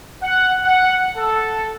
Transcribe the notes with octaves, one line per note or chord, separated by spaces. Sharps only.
F#5
F#5
A4